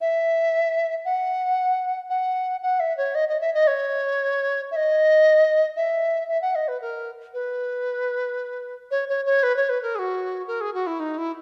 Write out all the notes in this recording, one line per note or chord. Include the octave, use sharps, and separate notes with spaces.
E5
F#5
F#5
F#5
E5
C#5
D#5
D#5
E5
D#5
C#5
E5
D#5
E5
E5
F#5
D#5
B4
A#4
B4
C#5
C#5
C#5
B4
C#5
B4
A#4
G#4
F#4
A#4
G#4
F#4
E4
D#4
E4